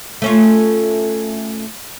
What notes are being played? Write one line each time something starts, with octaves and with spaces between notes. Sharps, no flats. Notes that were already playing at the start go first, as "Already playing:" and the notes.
A3 C#4 F4